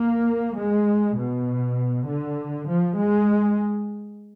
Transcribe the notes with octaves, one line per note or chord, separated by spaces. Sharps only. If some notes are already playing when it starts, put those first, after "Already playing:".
Already playing: A#3
G#3
B2
D3
F3
G#3